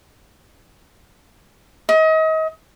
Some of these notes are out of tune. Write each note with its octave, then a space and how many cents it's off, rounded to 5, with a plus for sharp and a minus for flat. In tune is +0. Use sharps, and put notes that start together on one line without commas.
D#5 +35